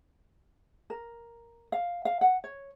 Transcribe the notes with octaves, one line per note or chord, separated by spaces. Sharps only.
A#4
F5
F5
F#5
C#5